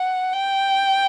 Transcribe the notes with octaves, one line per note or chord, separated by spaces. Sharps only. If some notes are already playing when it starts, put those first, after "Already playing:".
Already playing: F#5
G5